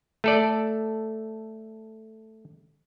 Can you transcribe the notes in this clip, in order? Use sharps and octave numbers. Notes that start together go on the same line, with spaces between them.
A3 A4 D5